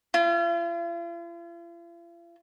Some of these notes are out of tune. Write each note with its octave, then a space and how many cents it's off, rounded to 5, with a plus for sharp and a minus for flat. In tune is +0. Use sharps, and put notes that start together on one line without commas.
F4 -45